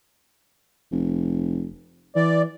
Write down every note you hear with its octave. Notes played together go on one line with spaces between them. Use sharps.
F1
E3 D5